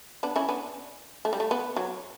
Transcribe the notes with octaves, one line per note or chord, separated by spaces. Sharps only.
B3 D4
C#4 E4
B3 D4
A3
G3
A3
B3
F#3